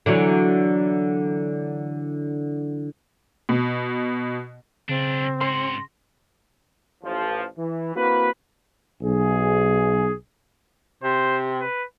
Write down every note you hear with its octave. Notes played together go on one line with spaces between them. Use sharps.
D3 E3 F#3
B2
B1 C#3 C4 D4
G#2 F#4 C6
A1 F3
E3
A#3 C4 E4 F#4 B4
B1 G#4
C3 C5
B4